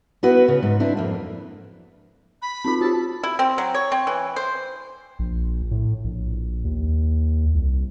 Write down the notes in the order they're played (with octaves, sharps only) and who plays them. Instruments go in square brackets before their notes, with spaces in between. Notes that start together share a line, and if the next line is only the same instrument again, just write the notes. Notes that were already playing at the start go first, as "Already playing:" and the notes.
[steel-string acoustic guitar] B3 E4 F#4 B4
C#3
G#2
C4 D4 E4
F2 A#3
[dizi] B5
[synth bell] C4 D#4 F4
[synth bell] F#4 G4 [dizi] A5
[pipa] E4
C4
F#3
C#5
C4
E3
C5
[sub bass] A#1
A2
A#1
D#2
C2